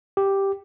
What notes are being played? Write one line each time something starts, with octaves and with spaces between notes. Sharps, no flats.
G4